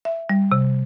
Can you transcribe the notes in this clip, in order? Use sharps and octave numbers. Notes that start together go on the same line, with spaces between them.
E5
G3
C3